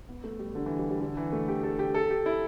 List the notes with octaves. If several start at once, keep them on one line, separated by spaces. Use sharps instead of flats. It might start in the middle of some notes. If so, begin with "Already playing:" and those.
B3
A3
G3
D3
E3
G3
G3
D3
E3
A3
G4
A4
G4
A4
G4
E4